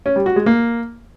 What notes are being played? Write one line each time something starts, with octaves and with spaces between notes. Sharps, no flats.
C#4
G3
F#4
G#3
A#3